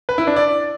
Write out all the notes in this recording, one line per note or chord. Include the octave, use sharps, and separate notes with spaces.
B4
E4
D4
D5